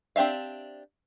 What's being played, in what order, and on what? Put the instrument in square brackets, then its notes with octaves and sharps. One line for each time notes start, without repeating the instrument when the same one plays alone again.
[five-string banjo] C4 D4 G4 E5 F5